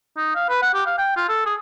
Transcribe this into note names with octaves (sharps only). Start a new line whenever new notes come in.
D#4
F5
B4
F#5
G4
F5
G5
F4
A4
G#4